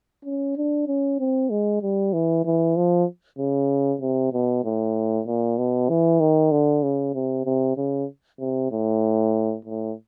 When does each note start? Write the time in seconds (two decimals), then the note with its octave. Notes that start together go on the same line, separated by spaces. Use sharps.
0.25 C#4
0.57 D4
0.88 C#4
1.20 C4
1.50 G#3
1.82 G3
2.13 E3
2.45 E3
2.77 F3
3.39 C#3
4.01 C3
4.33 B2
4.64 A2
5.27 A#2
5.58 B2
5.89 E3
6.20 D#3
6.52 D3
6.83 C#3
7.14 C3
7.45 C3
7.77 C#3
8.40 C3
8.72 A2
9.65 A2